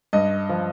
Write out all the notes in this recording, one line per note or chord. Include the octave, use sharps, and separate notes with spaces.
G2 D#5
F3